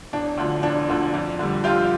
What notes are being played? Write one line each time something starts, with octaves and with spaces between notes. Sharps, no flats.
E1 D4
D2 D3 F3
E1 D4
D2 D3 F3
F2
D3 G3
F2 F4 G4